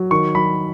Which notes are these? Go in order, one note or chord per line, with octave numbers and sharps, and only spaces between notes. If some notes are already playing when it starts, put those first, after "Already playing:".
Already playing: F#3
D#3 C#6
F#3 B5